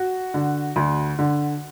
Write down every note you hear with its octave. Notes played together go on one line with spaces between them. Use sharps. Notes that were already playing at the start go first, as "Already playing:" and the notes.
Already playing: F#4
D3
D2
D3